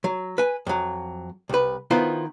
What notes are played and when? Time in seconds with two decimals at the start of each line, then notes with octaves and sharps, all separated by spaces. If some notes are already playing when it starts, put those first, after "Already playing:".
0.04 F#3
0.38 B4 G#5
0.67 F2 F#3
1.49 C2 B4
1.91 D#3 B3 E4 F4 C5